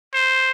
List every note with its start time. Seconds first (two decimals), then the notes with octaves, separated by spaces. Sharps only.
0.14 C5